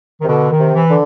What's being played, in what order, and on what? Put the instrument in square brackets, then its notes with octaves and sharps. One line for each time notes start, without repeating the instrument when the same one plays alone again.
[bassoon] C3 [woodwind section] D#3
[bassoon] B2 [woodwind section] D3
[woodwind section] D#3
[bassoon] C3
[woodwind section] E3
[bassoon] D3